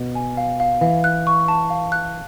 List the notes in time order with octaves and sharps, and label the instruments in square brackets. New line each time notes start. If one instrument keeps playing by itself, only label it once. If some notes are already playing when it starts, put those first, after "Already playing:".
Already playing: [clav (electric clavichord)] B2
[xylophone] G#5
F5
F5
[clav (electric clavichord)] E3 [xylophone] F5
[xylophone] F#6
C#6
A5
F5
F#6